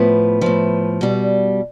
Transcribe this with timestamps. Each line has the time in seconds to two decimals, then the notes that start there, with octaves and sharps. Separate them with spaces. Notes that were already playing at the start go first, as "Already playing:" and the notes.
Already playing: A2 F3 B3
0.41 A2 F3
1.01 B2 G3